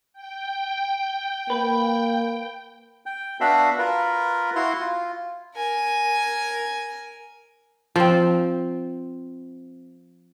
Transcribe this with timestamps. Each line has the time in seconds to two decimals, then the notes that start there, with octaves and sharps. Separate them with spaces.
0.13 G5
1.50 A#3 B4
3.06 G5
3.41 B3 D4 F#4 E5 F5 B5
3.79 F4 A#4 B4
4.55 E4 F#4 F5 C6
4.80 F4
5.56 A#4 G#5
7.96 F3 C4